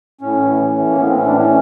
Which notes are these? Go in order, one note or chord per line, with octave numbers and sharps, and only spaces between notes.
A2 C#4
E3
E3
A2
A#3
A2 B3
C4
E3 C#4
D4
E3 C#4